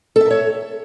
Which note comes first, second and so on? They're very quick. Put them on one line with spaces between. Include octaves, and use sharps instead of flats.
A4 E5 A#4 C#5